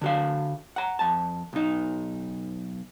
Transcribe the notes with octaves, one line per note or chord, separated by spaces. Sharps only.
D3 F#4 F5
F#5 A#5
F2 A5
B1 D#4